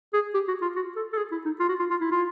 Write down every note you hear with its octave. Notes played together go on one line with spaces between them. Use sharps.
G#4
G4
F#4
F4
F#4
A4
A4
G#4
E4
D#4
F4
F#4
F4
F4
E4
F4